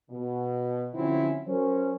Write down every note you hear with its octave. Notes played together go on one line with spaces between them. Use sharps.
B2
D3 F3 F#3 C4 C#4 E4
F#3 C#4 A#4 C5